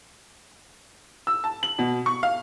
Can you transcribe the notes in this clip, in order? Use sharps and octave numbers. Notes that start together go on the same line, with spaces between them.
E6
A5
F#7
B2
C#6
F5